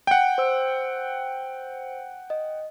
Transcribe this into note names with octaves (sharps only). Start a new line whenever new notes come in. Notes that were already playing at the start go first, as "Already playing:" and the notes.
F#5 G5
C5 E6
D#5